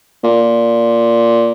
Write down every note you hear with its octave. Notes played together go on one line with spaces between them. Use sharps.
A#2